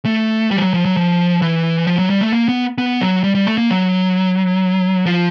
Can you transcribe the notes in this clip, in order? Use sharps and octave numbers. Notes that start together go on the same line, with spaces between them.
A3
G3
F3
F#3
F3
F#3
F3
E3
F3
F#3
G3
A3
A#3
B3
B3
F#3
G3
G3
A3
A#3
F#3
F3